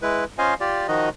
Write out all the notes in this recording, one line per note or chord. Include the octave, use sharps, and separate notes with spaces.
G#3 E4 B4
C#4 F4 C5 D#5 F5 G#5
F4 G4 D5
D#3 F3 D#4 F#4 D#5